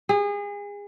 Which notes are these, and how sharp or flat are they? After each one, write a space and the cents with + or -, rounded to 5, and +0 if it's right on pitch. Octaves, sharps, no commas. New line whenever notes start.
G#4 -30